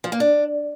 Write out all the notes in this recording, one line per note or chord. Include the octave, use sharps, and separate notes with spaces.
F3
A#3
D4